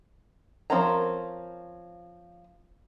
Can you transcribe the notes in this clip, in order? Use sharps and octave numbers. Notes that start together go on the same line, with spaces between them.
F3 C4 C#4 A#4 A#5